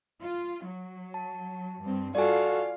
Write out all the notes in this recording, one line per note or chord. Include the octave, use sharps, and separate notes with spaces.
F4
F#3
A5
G2 C4
F4 F#4 A4 D5 F5 G#5